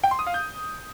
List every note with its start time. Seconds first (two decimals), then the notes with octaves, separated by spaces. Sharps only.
0.04 G5
0.11 C6
0.19 D#6
0.27 F5
0.34 G6